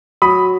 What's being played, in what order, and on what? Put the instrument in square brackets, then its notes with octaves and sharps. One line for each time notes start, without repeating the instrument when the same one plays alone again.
[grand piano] F#3 B5 D#6